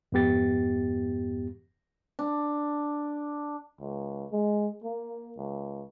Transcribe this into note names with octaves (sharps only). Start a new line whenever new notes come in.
F2 G#2 B3 G4 A6
D4
C#2
G#3
A#3
C#2